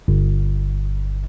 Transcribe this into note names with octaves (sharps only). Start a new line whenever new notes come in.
G1